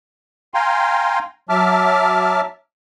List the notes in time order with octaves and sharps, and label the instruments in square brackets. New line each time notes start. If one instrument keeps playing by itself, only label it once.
[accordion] F5 G5 G#5 A#5 C6
F#3 E5 A5 D6 F6